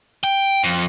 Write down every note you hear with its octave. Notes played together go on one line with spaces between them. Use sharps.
G5
F2